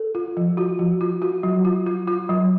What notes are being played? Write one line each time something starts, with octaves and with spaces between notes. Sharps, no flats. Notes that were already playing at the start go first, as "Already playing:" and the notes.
Already playing: A4
F4
F3
F4 F#4
F3
F4
F4 F#4
F#3
F4
F4
F4
F#3